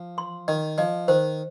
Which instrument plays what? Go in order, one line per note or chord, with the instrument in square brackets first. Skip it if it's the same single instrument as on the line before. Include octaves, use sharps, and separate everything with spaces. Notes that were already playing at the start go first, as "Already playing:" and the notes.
Already playing: [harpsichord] F3
[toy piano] C6
[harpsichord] D#3 [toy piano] D#5
[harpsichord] F3 [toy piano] D#5
[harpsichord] D#3 [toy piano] C5